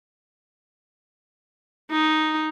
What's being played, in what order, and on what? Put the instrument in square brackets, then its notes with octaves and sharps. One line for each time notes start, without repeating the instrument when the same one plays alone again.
[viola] D#4